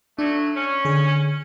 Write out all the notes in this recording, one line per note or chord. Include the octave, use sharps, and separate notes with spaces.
F#3 A3 D4
C#4
D3 G#4